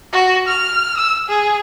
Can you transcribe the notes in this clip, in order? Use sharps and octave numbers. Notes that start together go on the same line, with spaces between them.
F#4
F6
E6
G#4